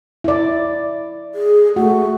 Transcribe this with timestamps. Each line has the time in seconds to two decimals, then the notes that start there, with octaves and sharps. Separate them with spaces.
0.24 E4 D5
1.35 G#4
1.76 A3 F#4